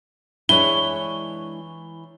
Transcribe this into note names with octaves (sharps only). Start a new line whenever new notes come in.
E3 G#3 D4 E4 C#5 G7